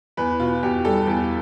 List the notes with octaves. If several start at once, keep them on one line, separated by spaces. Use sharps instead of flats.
E2 B4
B2 F4
E2 G4
G3 A4
E2